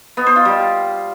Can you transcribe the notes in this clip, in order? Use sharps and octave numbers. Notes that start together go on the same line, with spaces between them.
B3
C5
F4
G3